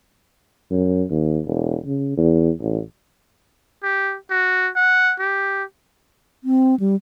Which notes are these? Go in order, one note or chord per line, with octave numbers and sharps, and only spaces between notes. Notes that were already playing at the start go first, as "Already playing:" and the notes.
F#2
D#2
E1
C#3
E2
A1
G4
F#4
F#5
G4
C4
G3